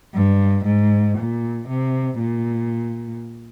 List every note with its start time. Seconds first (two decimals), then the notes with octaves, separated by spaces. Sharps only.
0.15 G2
0.66 G#2
1.18 A#2
1.68 C3
2.19 A#2